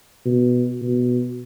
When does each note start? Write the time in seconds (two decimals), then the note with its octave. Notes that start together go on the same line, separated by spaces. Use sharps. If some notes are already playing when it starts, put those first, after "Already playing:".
0.26 B2
0.82 B2